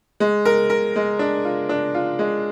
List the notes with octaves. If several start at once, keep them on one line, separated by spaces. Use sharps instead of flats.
G#3
A#4
A#4
G#3
D4
F4
D4
F4
G#3